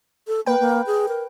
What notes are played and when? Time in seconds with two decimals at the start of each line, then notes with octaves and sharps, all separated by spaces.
0.28 A4
0.46 A#3 B4 G5
0.60 A#3
0.87 G#4
1.08 A#4